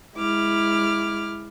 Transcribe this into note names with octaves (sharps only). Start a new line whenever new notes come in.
G#3 E4 D6 F6